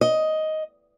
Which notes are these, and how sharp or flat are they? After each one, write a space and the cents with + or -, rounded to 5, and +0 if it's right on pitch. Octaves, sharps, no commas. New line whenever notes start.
D#5 +10